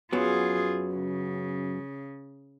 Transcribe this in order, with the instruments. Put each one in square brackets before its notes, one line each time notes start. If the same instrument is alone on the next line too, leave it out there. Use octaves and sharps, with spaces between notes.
[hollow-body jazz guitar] F#2 F#3 B3 [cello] F4 G#4
[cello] C#3